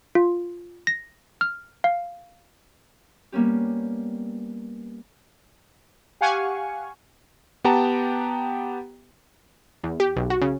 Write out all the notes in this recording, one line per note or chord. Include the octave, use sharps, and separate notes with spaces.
F4
A#6
F6
F5
G3 A#3 B3 C#4 G4
G4 F5 F#5 G#5 C#6
B3 G4 F#5 G5 A5 A#5
E2
G4
B1
F#4
C#3